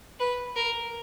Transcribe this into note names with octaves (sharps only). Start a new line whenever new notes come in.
B4
A#4